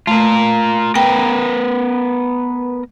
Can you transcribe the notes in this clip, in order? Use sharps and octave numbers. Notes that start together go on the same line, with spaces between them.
A3 F4 A#4
B3 A#4 B4 G5